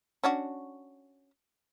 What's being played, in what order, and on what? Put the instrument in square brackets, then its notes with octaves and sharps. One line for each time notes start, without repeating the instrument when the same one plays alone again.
[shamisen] C#4 D4 F#4